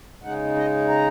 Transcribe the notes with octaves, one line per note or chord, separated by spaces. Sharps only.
C#3 G#3 D#4 F#5
D#5
A#5